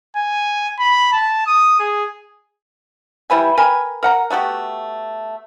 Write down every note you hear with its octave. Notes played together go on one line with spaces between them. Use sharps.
G#5
B5
A5
D#6
G#4
G3 E4 B4 G#5
A#4 B4 G5 G#5
A#4 F#5 A#5
A3 B3 F#4 G4